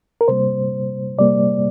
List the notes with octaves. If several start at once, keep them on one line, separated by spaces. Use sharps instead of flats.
A#4
C3 G3 A#3 C5
C3 G3 A#3 D5